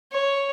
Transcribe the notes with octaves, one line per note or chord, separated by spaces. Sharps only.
C#5